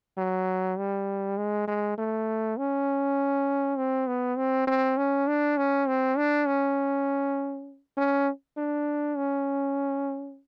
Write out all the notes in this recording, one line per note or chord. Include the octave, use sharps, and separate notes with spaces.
F#3
G3
G#3
G#3
A3
C#4
C4
B3
C4
C4
C#4
D4
C#4
C4
D4
C#4
C#4
D4
C#4